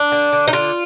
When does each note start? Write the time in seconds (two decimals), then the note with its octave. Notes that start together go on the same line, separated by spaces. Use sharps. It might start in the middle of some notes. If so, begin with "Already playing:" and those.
Already playing: D4
0.12 D3
0.32 D3
0.48 D#4
0.53 D3 F4